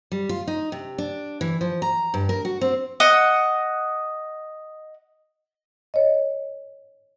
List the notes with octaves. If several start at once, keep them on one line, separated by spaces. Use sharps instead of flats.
G3
F4
D#4
C3
D4
E3
F3
A#5
G2
A#4
F#4
C4
D#5 F#5
C#5 D#5